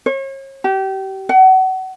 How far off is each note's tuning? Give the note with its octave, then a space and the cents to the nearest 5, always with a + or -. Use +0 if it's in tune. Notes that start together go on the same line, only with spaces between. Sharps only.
C#5 -40
G4 -30
F#5 +30